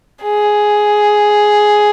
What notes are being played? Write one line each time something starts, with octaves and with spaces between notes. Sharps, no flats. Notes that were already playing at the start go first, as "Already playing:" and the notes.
G#4